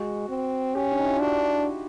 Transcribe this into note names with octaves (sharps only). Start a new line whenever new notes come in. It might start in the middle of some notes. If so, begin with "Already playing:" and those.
Already playing: G#3 F#4
C4
C#4 G4
D4
D#4
E4
F4
D4 F#4